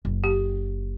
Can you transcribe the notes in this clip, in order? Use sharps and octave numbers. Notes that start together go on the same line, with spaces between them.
F#1
G4